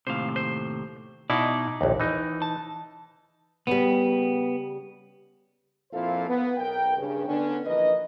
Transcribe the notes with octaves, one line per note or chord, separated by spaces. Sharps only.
D#2 A2 C3 C5 F5
C5
B2 D#4 E4 D5
A#1 D#2
E3 D#4
A5
C#3 G3 B3
F2 A#2 E4 A4 C5 F5
B3
B1 A#4 G5
G2 C#3
D3 B3 C#4 D4
A#1 E3 A#4 B4 D#5